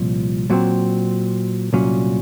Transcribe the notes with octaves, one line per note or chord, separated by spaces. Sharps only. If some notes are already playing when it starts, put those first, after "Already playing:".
Already playing: C2 A#2 F3
A#2 F#3 C4
C2 A#2 F#3 C#4